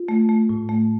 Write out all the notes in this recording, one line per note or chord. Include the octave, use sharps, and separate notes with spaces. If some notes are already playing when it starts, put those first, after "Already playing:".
Already playing: F4
A3
A3
A2
A3